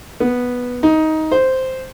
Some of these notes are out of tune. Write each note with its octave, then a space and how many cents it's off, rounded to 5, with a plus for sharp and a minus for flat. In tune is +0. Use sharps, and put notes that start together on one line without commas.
B3 -5
D#4 +15
C5 -5